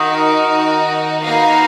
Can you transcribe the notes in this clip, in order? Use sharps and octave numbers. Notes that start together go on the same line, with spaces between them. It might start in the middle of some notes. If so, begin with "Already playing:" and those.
Already playing: D#3 D#4 F#4 A#4
A#3 D#4 F#4 B4 F5